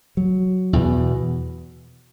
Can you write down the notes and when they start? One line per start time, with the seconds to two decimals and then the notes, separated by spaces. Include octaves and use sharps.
0.17 F#3
0.73 E2 B2